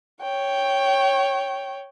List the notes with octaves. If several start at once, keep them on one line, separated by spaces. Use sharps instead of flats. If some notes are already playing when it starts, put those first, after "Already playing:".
C#5 G5